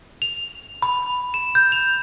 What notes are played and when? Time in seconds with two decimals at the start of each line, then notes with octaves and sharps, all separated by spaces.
0.22 F7
0.82 B5
1.34 E7
1.55 G6
1.72 F7